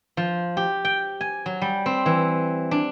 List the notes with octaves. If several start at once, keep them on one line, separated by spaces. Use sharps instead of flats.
F3
G4
G5
G#5
F#3
G3
C4
E3
D4